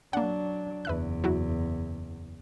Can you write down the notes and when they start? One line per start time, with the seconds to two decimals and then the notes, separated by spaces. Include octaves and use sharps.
0.13 F#3 A#3 D4 F#5
0.85 F#1 E2 B4 E5 F#6
1.24 F#3 E4 F#4